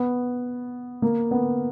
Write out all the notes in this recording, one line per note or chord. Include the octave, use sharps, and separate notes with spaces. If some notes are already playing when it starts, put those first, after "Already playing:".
Already playing: B3
A#3
B3